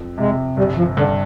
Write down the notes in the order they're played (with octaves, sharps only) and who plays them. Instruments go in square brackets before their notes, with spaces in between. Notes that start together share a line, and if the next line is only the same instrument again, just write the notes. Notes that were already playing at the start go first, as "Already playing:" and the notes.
Already playing: [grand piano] F2
[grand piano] C3 [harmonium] G#3
[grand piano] G1 [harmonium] G3
[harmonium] F3
[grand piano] G2 [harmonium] D3